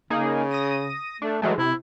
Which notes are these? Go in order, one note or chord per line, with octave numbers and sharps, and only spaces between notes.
C#3 A#3 D#4 G#4
D#6 A#6 D#7
A3 D4
E3 F#3 G#3 A3
C3 E4